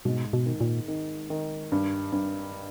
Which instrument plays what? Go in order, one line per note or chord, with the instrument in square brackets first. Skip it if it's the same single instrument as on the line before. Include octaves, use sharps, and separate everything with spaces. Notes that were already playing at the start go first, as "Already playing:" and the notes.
[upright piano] G#2 [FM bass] B2
[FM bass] B2
[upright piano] D#3
[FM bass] A#2
[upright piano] D#3
D#3
G2
G2